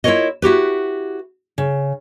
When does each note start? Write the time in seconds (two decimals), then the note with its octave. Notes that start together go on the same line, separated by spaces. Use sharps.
0.04 E4 F4 A4 A#4 C#5 D#5
0.42 E4 F#4 G4 B4
1.58 C#3